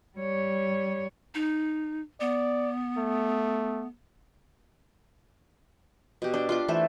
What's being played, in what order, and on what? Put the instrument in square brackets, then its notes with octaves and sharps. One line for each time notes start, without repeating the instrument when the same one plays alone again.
[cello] G3 C#5
[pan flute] D#4
[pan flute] B3 [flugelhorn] D5
[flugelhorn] A3
[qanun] B2 G4
D4 G5
F4 C6 D6
E3 A3 A4 C5